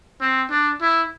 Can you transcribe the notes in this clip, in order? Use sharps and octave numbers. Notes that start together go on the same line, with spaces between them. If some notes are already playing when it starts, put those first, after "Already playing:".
C4
D4
E4